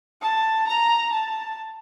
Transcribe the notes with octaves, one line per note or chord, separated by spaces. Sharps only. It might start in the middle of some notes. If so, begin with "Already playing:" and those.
A5
A#5
A5